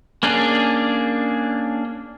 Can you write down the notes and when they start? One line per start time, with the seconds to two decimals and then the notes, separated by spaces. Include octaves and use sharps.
0.23 A#3 C#4 D4 G#4